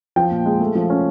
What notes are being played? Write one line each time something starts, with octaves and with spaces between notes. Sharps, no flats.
F3 G5
A#2
G#3
A3
F3
C#4